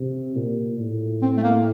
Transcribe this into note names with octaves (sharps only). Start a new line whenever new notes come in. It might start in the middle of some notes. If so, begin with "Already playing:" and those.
Already playing: C3
A#2
A2
C4
A3
A#3